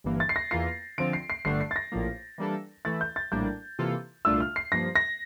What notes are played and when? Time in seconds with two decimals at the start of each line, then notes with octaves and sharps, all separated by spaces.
0.04 G1 G2 E3 A#3
0.20 A6
0.29 C7
0.36 A#6
0.51 E2 E3 A#3 F4 C7
0.98 D3 F3 C4 F4 D7
1.13 C7
1.30 C7
1.45 G1 G2 D3 A3 D4 C7
1.61 C7
1.71 A6
1.76 A#6
1.92 A#1 A2 F3 A#3
2.38 E3 G3 A#3 D4 A4
2.85 E3 A3 E4 A6
3.01 G6
3.16 A6
3.32 A#1 A2 G3 A#3 D4 G6
3.79 C3 E3 A#3 F4 A4
4.25 C2 A#2 A3 D4 F4 E6
4.40 F6
4.56 C7
4.72 G2 F3 A#3 A#6
4.96 A#6